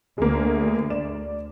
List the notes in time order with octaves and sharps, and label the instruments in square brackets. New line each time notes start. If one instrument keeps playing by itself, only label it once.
[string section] D2 [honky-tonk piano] G#3 A#3
[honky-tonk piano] D5 E7